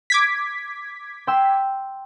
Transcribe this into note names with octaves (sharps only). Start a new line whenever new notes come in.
D6 G#6 B6
G5 C6 E6